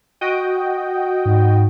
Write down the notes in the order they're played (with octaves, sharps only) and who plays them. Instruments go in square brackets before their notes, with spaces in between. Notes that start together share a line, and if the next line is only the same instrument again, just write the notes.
[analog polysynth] F#4 D#5 G5
[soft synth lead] G#2